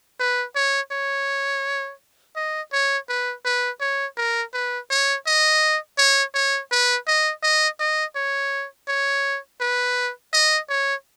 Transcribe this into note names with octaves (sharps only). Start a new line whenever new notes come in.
B4
C#5
C#5
D#5
C#5
B4
B4
C#5
A#4
B4
C#5
D#5
C#5
C#5
B4
D#5
D#5
D#5
C#5
C#5
B4
D#5
C#5